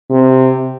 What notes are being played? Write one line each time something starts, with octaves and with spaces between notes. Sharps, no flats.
C3